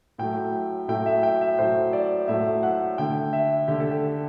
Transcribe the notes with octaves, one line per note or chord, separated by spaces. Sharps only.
A2 F#3 A3 G5
A2 F#3 A3 G5
E5
G5
E5
A2 F#3 A3 C5
D5
A2 F#3 A3 E5
F#5
D3 A3 G5
E5
D3 A3 G4
A4
G4